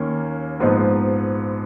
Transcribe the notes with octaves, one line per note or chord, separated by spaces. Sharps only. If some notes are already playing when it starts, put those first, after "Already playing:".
Already playing: D#2 D#3 A#3 C#4
A#1 G#2 F3 B3 D#4